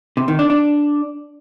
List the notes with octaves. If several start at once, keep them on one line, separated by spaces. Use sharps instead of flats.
C3
D#3
D4
D4